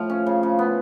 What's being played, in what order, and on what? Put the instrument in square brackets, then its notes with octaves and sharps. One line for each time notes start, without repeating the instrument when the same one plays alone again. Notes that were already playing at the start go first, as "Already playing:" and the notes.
Already playing: [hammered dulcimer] A2 F3 F5
C#4
C#3
C#3
B3